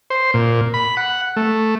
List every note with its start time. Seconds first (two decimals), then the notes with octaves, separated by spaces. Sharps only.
0.10 C5
0.34 A#2
0.74 B5
0.97 F#5
1.37 A3